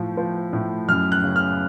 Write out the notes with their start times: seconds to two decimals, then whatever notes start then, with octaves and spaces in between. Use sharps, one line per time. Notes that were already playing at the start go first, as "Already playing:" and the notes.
Already playing: A2 F3
0.17 F3
0.53 A2
0.88 F#2 F6
1.12 F#6
1.23 C#3
1.36 F6